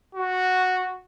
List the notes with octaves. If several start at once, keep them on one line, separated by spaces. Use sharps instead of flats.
F#4